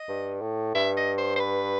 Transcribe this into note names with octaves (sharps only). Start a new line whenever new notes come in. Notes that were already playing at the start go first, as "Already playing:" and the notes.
Already playing: D#5
G2
A2
G2 E5
D#5
C5
C5
B4